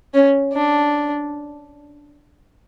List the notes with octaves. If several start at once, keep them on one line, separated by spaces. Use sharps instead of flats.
C#4
D4